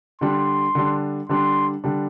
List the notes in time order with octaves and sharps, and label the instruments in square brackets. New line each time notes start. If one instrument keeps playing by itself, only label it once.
[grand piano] D3 G3 D4 [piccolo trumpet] C6
[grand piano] D3 G3 D4
[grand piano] D3 G3 D4 [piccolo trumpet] C6
[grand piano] D3 G3 D4